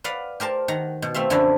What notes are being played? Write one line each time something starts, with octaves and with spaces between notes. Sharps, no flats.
B4 D5 F5 F#5 B5
G4 A#4 C5 A5
D#3 F#5 A#5
B2
A3 C4 E5 F5
F#2 D3 F3 A3 D4 E4